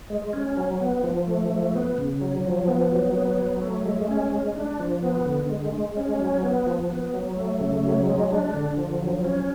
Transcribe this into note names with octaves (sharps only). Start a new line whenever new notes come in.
G#3
C#4
F#3
B3
F3
A3
F3
B3
C#3
F#3
F3
B3
F#3
B3
F#3
A3
G#3
C#4
G#3
D4
F3
B3
D3
G#3
G#3
C#4
F#3
B3
F3
B3
F#3
A3
C#3
F#3
G#3
D4
D3
F3
F#3
C#4